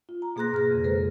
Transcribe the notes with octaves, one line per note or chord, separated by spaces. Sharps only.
F4
A#5
B2 A#3 G#4 C6 F#6 A#6
G#2 F6 A#6
F2 C#3
G#3 A4 B4 C5